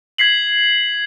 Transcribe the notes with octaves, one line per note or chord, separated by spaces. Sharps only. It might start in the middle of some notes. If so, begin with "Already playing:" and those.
G#6 B6 C7 F#7